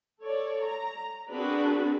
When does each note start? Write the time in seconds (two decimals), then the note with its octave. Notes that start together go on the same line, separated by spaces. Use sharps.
0.22 A4 C#5 D5
0.62 A#5
1.30 C4 D4 F#4 G#4 A#4 B4